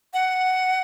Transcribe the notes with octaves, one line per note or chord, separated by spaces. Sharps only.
F#5